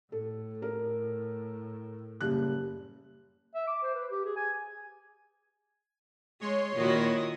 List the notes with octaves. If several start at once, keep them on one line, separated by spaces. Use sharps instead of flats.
A2 A4
A#4
F#1 G3 F#6
E5
D6
C5
B4
G4
G#4
G#5
G#3 C#5 C6
A#2 D#3 E4 F#4 D#5